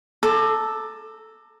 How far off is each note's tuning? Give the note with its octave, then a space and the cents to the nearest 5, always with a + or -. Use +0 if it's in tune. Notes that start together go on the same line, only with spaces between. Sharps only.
A4 +0 A#5 -20 D6 +25